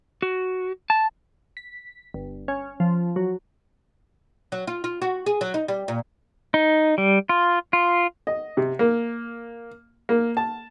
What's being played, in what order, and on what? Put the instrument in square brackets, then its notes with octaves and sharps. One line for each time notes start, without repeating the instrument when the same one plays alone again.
[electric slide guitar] F#4
A5
[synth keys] B6
G1
C#4
F3
F#3
[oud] F#3
F4
F4
F#4
G#4
F#3
D#4
G3
A#2
[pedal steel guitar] D#4
G3
F4
F4
[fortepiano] D#5
C3
A#3
A#3
A5